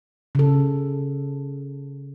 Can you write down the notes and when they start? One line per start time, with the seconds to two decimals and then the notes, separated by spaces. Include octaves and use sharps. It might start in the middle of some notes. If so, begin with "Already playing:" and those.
0.35 C#3 A4